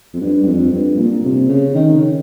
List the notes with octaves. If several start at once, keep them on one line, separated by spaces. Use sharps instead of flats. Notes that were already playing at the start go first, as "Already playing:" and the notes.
F2
G2
G2
F2
G2
A#2
C3
C#3
D#3
C#3